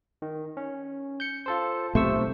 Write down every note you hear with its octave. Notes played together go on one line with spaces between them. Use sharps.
D#3
C#4
G6 C#7
F4 A4 C5
B1 C3 A3 C5 C#6 E6